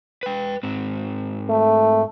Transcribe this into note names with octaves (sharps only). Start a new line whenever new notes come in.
B4 G5
G#2 C4
A3